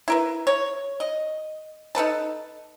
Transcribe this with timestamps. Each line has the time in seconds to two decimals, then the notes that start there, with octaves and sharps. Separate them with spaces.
0.08 E4 A#4 B4
0.47 C#5
1.00 D#5
1.95 D#4 A4 B4 A5